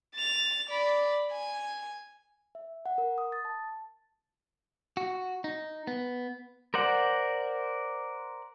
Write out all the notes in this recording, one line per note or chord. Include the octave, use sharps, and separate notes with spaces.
A6 F7
D5 B5
G#5
E5
F#5
A#4
D#6
A6
A5
F#4
D#4
B3
A#4 C5 D5 F#5